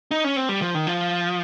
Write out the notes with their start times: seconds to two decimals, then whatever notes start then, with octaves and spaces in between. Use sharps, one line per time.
0.11 D#4
0.24 C#4
0.36 C4
0.49 G3
0.61 F3
0.75 D#3
0.87 F3